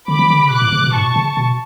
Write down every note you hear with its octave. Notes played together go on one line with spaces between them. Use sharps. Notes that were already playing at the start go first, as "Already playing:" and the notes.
D3 B5 D6
E3
D3
C#3
B2 D6 F#6
A2
C#3
B2
G#2 A5 C#6
B2
C#3
B2